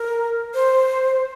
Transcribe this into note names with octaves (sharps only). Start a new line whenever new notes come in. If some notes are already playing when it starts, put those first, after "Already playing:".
Already playing: A#4
C5